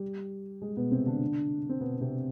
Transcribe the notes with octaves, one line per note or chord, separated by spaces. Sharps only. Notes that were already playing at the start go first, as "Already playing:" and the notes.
Already playing: G3
G#3
B2 B3
C3 C4
D3 D4
C4
B2 B3
C3 C4